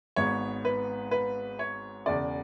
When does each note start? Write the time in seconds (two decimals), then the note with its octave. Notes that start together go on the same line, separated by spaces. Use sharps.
0.16 G#1 G#2 G#3 B3 C#5
0.65 B4
1.11 B4
1.59 C#5
2.06 E1 E2 C#3 D5